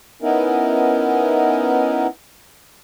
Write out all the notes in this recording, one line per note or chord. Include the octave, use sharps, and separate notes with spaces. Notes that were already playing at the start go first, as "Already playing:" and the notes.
B3 C#4 D#4 E4 A#4